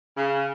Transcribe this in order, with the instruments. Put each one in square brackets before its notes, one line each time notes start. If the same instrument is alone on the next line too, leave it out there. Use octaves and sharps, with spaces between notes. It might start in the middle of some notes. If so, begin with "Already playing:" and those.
[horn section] C#3